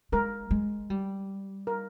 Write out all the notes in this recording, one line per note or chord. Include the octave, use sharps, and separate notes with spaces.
G#3 A#4
G#3
G3
A#4